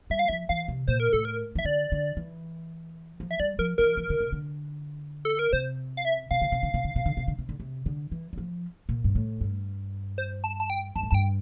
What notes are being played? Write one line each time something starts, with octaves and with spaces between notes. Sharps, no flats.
G3 E5
F5
F3 E5
E3 F5
C3
A#2 C5
A#4
A2 A4
A#4
E3 E5
D3 D5
D3
E3
F3
E5
G3 D5
F3 A#4
E3 A#4
E3
D3
C3
D3
A4
A#4
C3 C5
F5
E5
C3 F5
D3
C3
D3
C3
D3
C3
D3
C3
D3
C3
D3
C3
D3
E3
G3
F3
A#2
G2
A2
G2
C5
A5
A5
G5
G2 A5
A2
G2 G5 A5